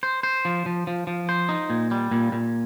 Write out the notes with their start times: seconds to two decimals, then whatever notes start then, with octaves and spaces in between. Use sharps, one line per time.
0.03 C5
0.23 C5
0.45 F3
0.66 F3
0.87 F3
1.07 F3
1.29 C5
1.49 D#4
1.70 A#2
1.91 G3
2.11 A#2
2.32 A#2